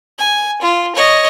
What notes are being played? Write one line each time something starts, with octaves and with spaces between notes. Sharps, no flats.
G#5
F4
C#5 D#5